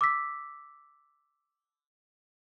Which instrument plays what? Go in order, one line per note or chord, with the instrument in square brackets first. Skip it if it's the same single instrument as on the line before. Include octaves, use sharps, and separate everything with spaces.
[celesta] D6 E6 B6